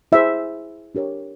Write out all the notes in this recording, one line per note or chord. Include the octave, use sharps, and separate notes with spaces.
E4 G#4 C5 E5
D4 G4 A#4 C#5